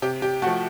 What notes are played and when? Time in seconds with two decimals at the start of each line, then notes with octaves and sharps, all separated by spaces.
0.02 C3 G4
0.22 G4
0.42 F3 A3 F#4